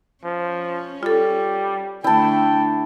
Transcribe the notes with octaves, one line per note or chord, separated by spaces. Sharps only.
F3 C#4
G3 F4 A4
D3 A3 E4 G5 A5